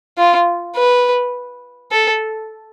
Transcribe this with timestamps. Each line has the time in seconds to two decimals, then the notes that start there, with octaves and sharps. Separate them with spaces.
0.18 F4
0.76 B4
1.92 A4